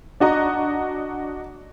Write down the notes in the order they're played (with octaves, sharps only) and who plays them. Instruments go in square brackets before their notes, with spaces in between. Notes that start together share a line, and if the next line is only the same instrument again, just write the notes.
[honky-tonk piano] D4 F#4 D#5 A#5